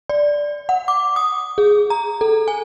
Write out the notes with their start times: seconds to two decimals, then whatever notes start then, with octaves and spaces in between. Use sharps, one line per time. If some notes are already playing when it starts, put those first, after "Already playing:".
0.09 D5
0.69 F#5
0.88 D6
1.16 D#6
1.58 G#4
1.90 A#5
2.21 A4
2.48 G#5